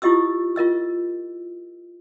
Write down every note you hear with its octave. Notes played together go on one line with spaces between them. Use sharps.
E4 F4 G4 D#5 D#6 E6
F4 A#4 D#5 E6